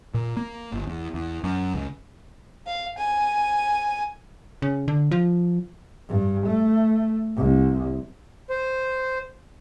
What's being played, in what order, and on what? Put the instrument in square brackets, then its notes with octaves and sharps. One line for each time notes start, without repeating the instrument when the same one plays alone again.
[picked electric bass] A#2
A#3
G1
E2
E2
F#2
C#2
[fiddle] F5
G#5
[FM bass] C#3
D3
F3
[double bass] G2
A3
C2
[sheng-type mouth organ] C5